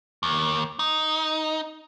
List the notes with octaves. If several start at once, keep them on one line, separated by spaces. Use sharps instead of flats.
D#2
D#4